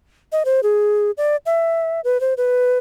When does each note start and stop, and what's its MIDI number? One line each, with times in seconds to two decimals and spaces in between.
0.32 0.43 75
0.45 0.61 72
0.63 1.11 68
1.17 1.36 74
1.46 2.01 76
2.04 2.20 71
2.21 2.34 72
2.37 2.78 71